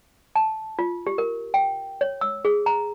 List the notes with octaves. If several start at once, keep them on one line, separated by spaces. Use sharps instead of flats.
A5
F4
G4
A#4
G5
C#5
E6
G#4
A#5